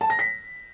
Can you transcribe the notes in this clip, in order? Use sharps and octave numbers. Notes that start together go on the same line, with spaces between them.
A5
A#6
B6